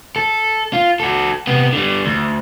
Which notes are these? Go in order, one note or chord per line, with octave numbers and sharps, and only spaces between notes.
A4
F4
F#4 A4
C3 B3
D3 G3
D2